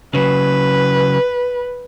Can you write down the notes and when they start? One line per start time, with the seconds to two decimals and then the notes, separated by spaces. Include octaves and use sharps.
0.14 C#3 F#3 B4